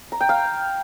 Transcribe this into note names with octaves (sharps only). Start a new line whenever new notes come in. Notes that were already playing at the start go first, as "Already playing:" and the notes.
A#5
G5
F5